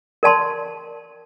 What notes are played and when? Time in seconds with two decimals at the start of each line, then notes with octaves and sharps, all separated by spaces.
0.23 A#4 D5 A5 C6